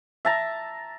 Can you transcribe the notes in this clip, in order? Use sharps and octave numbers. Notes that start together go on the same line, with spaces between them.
E5 A5 A#5